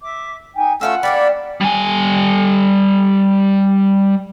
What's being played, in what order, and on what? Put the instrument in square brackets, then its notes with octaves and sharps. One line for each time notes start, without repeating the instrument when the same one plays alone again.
[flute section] E5 D6
D#4 G5 G#5
[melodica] A3 C#4 E6 [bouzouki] E4 F4 G#4 [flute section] F#5
[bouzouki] G3 A#3 D4 [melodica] D5 B5
[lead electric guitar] G3 G#5